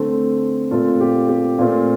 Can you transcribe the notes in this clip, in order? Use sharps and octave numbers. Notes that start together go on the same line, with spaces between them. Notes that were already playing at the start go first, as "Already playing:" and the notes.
Already playing: D3 A3 C4 A4 C5
A#2 A3 C4 F4 A4
G4
G4
A#2 A3 C4 F4